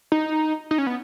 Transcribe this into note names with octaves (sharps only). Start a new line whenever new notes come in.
D#4
D#4
C#4
B3